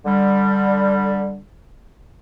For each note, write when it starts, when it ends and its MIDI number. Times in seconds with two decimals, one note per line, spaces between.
0.05 1.39 50
0.05 1.39 55